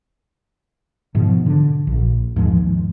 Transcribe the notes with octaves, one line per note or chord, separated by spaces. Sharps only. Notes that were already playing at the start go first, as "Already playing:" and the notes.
G#2 B2 F3
D3
A#1
D#2 G#2 F3 G#3